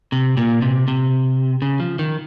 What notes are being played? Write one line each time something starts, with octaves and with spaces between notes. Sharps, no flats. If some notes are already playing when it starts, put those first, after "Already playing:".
C3
A#2
C3
C3
C#3
F3
D#3